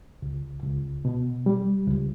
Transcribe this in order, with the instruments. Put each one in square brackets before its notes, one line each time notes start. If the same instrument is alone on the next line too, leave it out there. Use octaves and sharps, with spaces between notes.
[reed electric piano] C#2
C#2
B2
G3
C#2